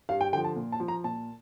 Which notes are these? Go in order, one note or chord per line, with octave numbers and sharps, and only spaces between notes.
G2 F5
G5
D3 F3 G5
A5
A#2
A5
F3
A#5
A#2 A5